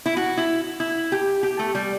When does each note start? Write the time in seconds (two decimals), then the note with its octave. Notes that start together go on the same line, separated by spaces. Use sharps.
0.06 E4
0.17 F#4
0.37 E4
0.80 E4
1.12 G4
1.43 G4
1.59 A3
1.75 G3